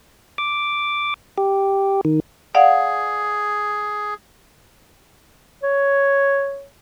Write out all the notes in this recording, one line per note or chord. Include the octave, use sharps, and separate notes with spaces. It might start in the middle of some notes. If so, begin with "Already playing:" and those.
D6
G4
D#3
G#4 D5 F5 F#5
C#5